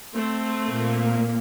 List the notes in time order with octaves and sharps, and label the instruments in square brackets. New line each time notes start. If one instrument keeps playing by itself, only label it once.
[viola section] A3 C4
[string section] A#2 A#3